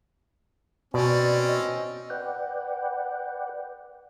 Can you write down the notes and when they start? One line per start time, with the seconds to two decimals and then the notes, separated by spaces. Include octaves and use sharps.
0.94 B2 C4 C#4 D5
1.47 D#5
2.10 B4 D5 F#5 G5